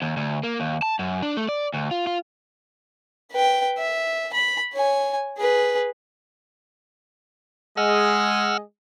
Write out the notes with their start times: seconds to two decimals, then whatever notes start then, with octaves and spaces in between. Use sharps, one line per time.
0.02 D#2
0.17 D2
0.43 A#3
0.60 D#2
0.82 A5
0.99 F#2
1.23 D4
1.37 A3
1.49 D5
1.74 D2
1.91 F4
2.07 F4
3.32 B4 G5
3.78 E5
4.33 B5
4.74 C#5 G#5
5.37 G#4 B4
7.77 G#3 G#4 D#5 F#5 E6 F6